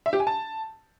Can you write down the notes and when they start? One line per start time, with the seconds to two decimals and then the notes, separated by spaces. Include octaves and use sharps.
0.06 E5
0.13 G4
0.20 G#5
0.27 A5